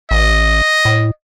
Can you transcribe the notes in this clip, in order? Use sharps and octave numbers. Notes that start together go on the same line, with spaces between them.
A1 D#5
A2